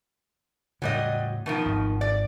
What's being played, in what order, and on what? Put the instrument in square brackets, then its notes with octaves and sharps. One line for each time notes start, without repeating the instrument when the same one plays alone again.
[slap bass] A2 C#3 [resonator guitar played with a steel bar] F#3 G3 D#5
[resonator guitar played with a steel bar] B2 D#3 F3
[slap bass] G#1
[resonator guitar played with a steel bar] D5